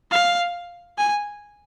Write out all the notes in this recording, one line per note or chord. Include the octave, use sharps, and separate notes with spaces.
F5
G#5